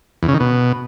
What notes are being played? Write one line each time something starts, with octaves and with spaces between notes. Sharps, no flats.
E2
C#3
D#3
B2